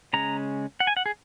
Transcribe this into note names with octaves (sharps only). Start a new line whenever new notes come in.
C#3 G#3 C#4 A#5
F#5
G#5
F#5
G#4